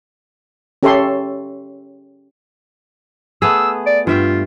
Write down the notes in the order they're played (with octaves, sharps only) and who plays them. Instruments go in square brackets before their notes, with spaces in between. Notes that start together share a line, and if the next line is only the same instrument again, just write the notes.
[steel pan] C#4 G4 A4 C#5 E5 C6
[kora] A3 B3 G#4 [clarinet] E6
[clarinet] D5
[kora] G2 E5 G5 [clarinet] F4